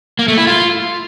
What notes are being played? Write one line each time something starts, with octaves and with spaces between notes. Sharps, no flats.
A#3
A3
E4
F4